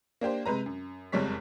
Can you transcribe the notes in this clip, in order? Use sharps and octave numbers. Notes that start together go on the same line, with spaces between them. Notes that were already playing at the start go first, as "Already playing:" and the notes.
A#3 D4 G4 C5
C3 G#3 B4 A#5
F#2
F#1 F2 G3 G#3 C#5 B6